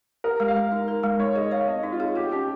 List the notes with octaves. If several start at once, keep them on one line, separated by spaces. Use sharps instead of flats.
G4 A#4
G#3
F5
G#3
D#4
A#4
G#3
D#4 C#5
G#4 D#5
C#5 F5
C4 D#5
D#4
F4
G#4
G4 G#4
C#4 G4